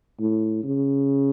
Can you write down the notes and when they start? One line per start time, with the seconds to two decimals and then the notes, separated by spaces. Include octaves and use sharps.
0.20 A2
0.64 C#3